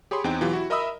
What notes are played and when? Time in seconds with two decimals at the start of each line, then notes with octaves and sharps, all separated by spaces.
0.11 G4 G#4 C#5 B5 C6
0.24 E2 C4 D#4 G5
0.41 B2 E3 F#3 F4 G4
0.53 E4 F#4
0.70 A#4 D#5 E5 B5 D#6 E6